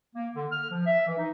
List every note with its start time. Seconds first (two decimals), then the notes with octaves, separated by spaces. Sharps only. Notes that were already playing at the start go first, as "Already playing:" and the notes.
0.15 A#3
0.36 D3
0.52 F6
0.71 F3
0.86 E5
1.06 E3
1.18 D#4